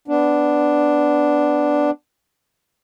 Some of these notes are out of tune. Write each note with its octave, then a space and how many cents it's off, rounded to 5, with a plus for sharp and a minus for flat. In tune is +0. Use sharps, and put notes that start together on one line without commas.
B3 +10 D4 +0